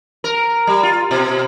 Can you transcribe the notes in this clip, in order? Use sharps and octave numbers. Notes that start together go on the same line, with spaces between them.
A#4
G3
F4
B2